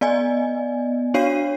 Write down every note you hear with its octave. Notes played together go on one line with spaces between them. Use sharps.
B3 D5 D#5 G#5
D4 F#4 C#5 F5 C7 D#7